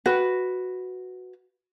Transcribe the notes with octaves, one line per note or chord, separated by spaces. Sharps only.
F#4 B4